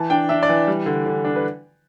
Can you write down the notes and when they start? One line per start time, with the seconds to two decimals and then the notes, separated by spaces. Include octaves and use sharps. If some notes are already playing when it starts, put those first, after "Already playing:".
Already playing: E3 A5
0.10 D4 G5
0.29 D4 E5
0.43 D5
0.49 E3
0.68 G3
0.86 D3
1.06 D3
1.25 D4
1.36 B4